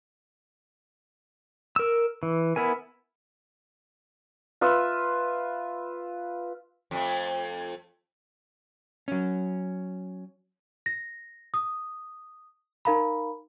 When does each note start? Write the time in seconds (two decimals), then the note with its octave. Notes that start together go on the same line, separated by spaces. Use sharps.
1.76 A#4 E6
2.23 E3
2.56 B3 E4 A#4 G#5
4.61 F4 B4 E5 E6
6.91 F2 A3
9.08 F#3 C#4
10.86 A#6
11.54 D#6
12.85 D#4 A#4 F5 A#5 B5